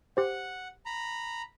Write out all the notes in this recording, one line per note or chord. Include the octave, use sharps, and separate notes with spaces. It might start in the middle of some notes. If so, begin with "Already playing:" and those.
G4 C5 F#5
A#5 B5